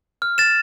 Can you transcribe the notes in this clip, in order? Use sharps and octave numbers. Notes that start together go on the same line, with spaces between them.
F6
A6 E7